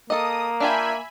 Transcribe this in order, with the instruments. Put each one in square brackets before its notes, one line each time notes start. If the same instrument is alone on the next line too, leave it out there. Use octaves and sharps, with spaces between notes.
[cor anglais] A#3 [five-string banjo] A4 D#5 [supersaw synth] D#6
[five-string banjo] D4 F4 G5 [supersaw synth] E5 G#5 B5